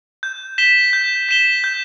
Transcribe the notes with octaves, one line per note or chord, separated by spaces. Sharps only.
G6
B6 E7 G7
G6
B6 E7 G7
G6